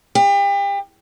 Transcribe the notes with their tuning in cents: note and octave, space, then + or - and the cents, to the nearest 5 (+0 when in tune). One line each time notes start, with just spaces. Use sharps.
G4 +35